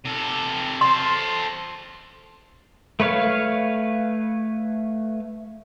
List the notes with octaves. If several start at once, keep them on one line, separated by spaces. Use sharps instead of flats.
C3 A4
A4 C5 C6
A3 B4 C#5 F5